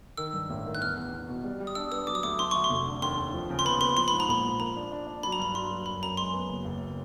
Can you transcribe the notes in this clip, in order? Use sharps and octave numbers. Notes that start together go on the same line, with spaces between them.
D#3 E6
G2
A1
D#3
F#6
E2 F6
E2
E2
B2
G3
G3
D#6
D4 E6
B3 D#6
F#3 D6
D#6
D2 D6
A3 C6
D2 C#6
C6
F1
D3
D#2 C6
D#2
F3
C#3
C6
B3 B5
B3 C6
F3 C6
G#2 B5
A#5
A#1 B5
F3
A#3 A#5
D4
D4
D4
F#3 B5
A#5
G2 B5
F#3 C6
F#3
F#2 B5
F#2 A#5
G#3 C6
B3
F#1
F#1